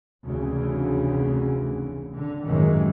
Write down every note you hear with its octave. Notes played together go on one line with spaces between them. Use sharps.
F1 D2 C#3 E3
D3
A1 F#2 D#3 E3 G#3